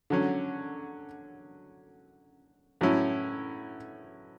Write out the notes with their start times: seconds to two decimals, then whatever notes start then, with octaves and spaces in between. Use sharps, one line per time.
0.10 D3 F#3 C#4
2.81 A2 F#3 C#4 E4